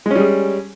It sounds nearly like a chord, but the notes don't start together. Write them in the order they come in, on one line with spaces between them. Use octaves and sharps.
G#3 C#4 G3 G#4